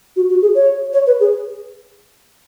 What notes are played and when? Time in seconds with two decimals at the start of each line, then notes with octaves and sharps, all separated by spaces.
0.16 F#4
0.30 F#4
0.42 G#4
0.55 C#5
0.93 C#5
1.07 B4
1.20 G#4